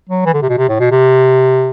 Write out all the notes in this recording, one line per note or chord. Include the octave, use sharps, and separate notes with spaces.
F#3
E3
D3
C3
B2
C3
A2
B2
C3